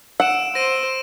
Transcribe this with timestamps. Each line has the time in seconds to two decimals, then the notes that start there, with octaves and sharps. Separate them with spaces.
0.20 F#5 E6 D7 E7
0.55 C5 A#6 D7 D#7